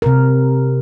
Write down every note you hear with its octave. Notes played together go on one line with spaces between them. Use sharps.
C3 A#4